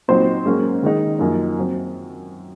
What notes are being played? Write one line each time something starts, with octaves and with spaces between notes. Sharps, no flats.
A#2 F#3 C4 D#4 C5
G#2 F#3 A#3 C#4
D#3 G#3 D#4
F#2 F3 A#3 D#4
F#3 C4